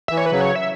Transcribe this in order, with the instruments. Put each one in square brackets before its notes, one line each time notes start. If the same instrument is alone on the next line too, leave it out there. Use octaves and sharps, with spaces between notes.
[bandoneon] E3 [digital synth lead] E5
[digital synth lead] C#5
B4
[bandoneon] C#3 F#3
[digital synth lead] C#5
E5